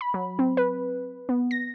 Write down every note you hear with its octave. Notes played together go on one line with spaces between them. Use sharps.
B5
F#3
C4
B4
B3
A#6